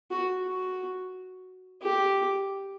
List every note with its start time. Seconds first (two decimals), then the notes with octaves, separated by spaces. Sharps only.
0.11 F#4
0.44 F#4
1.82 G4